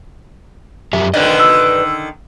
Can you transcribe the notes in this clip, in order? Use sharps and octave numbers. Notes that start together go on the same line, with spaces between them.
F#2 G4 E5
D3 D#3 B4 D5 D#5
E6